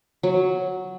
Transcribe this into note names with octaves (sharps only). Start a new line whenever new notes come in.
F#3